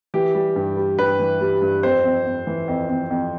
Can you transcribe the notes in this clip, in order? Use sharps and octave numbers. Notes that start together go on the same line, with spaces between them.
E3 G4
G3
G2
G3
G2 B4
E3
G3
G2
F2 C5
F2
F2
E3
F2
F2
F2